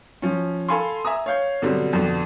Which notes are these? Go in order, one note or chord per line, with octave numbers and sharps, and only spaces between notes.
F3 C#4
A4 F5 G#5 B5 C6
E5 G#5 A#5 D#6
C#5 F5 G6
B2 D3 F#3 G3 C4
F2 B2 D3